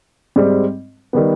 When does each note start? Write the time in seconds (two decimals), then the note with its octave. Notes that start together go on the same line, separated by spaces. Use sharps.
0.36 G#2 G3 C4
1.13 D#3 G3 B3